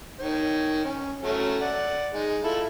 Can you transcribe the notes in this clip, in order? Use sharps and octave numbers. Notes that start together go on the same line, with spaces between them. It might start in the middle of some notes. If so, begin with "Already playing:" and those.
D#3 C#5
C#4
F#3 A3 C#4
D5 F#5
G#3 D#4
E4 F4 A4